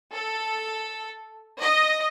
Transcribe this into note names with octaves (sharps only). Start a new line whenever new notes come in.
A4
D#5